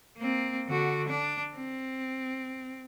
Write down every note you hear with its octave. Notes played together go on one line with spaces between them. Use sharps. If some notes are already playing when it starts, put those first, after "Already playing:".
A#3 C4
D3 F#4
D4
C4